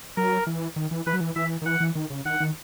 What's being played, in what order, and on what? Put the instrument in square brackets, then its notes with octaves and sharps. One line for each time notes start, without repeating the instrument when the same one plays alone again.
[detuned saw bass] F#3 [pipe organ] A#4
[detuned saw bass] E3
D#3
E3
[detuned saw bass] E3 [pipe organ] B4
[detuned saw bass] F#3
E3
[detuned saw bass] E3 [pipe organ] E5
[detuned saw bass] D#3
[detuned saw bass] E3 [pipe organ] F#5
[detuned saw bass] E3
D#3
C#3
[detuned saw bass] D#3 [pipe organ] F#5
[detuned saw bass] D#3